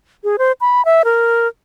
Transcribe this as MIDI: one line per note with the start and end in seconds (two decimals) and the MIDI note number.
0.24 0.36 68
0.38 0.52 72
0.61 0.84 83
0.85 1.02 76
1.05 1.47 70